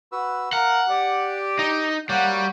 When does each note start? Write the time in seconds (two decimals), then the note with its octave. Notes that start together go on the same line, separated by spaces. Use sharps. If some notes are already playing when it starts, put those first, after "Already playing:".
0.12 F#4 B4 E6
0.53 A#4 F5 F#5
0.89 G4 D5
1.59 D#4
2.09 G3 A#3 C#5 F#5 D6
2.33 F#4